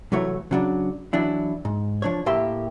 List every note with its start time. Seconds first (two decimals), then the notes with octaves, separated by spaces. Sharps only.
0.12 C2 E3 F#3 A3 C#5
0.51 C#3 F#3 D4
1.13 E3 F#3 D4 E4
1.65 G#2
2.02 F3 D4 C#5
2.26 A2 A3 A#3 G4 E5 C6